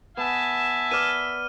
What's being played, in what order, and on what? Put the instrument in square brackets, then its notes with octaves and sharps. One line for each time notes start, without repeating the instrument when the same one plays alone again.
[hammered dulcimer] B3 [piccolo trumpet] E5 [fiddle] G#5 A5
[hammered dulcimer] B4 D5 [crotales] F6 D#7